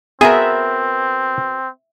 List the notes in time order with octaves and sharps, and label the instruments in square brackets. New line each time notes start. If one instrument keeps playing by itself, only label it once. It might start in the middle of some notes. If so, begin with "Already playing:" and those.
[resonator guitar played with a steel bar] B3 F#4 A#4 [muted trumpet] C4 [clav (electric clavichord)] G#4 G#5 [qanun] E5